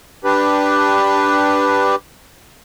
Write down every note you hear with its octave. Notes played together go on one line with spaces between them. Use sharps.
D4 G4 B4